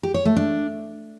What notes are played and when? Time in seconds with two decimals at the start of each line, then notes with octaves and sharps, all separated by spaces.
0.03 G4
0.14 C#5
0.25 A3
0.36 D4